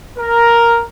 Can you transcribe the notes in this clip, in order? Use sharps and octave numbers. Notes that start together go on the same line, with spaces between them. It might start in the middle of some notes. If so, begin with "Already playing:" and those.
A#4